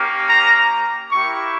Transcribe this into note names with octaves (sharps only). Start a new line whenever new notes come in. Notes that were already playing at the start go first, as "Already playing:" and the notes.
Already playing: A#3 C#4 G4
A#5
A#3 E4 G4 C#6